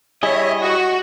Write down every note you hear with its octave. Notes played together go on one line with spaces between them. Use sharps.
G3 E4 G#4 C#5 D#5 E5
F#4 C#6